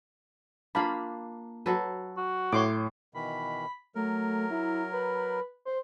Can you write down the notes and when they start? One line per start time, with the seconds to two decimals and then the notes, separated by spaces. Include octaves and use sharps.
0.75 A#3 D4 F4 F5 B5
1.66 F#3 A4 B4
2.17 F#4
2.53 A2 C#5 C6 D6
3.14 B2 D#3 E3 B5
3.95 F#3 A3 A#4
4.51 E4
4.92 B4
5.65 C5